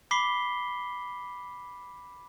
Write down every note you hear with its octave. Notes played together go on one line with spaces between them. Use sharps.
B5 D6 B6 C7 G7